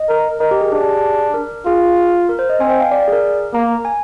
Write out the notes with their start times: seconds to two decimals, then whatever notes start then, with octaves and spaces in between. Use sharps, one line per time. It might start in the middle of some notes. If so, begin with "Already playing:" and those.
Already playing: D#5
0.09 A#4
0.40 A#4 D#5
0.51 G4
0.61 G#4
0.72 D4 G#4
0.82 G4
0.91 G#4
1.34 A#4
1.66 F4 G#4
2.29 A#4
2.39 C5
2.49 D#5
2.60 C4 G#5
2.70 G5
2.81 F5
2.91 D5
3.02 D5
3.08 G#4
3.12 A#4
3.54 A#3 A#5
3.85 G#5